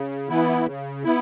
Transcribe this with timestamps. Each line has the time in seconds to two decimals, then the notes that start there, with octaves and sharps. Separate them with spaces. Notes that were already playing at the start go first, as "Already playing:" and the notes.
Already playing: C#3
0.29 E3 B3 E4
0.66 C#3
1.04 B3 E4